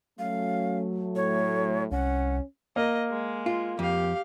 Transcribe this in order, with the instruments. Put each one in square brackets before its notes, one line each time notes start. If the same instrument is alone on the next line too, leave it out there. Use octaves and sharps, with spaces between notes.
[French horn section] F#3 A3 [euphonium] C#4 [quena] F5
[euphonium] A2 [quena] C#5
[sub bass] C2 [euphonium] C#4 [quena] F#5
[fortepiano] A#3 [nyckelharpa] D#5
[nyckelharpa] G#3
[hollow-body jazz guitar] F4
[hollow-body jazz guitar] F2 [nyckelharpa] G4 F5